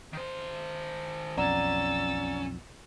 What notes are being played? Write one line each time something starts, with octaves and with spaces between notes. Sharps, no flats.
D#3 C5
B1 F2 C#4 D5 F#5 A#5 E6 A6